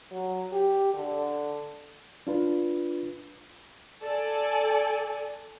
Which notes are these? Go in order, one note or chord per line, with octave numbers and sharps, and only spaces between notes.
F#3
G4
D3
D4 F4 B4
A4 D5 G#5